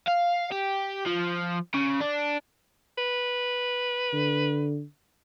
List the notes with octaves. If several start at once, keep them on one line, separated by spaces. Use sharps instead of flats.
F5
G4
F3
C#3
D4
B4
D3